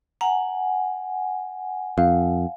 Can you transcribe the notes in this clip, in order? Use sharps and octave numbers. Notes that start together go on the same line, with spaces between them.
F#5 G#5 A#5
F2 F5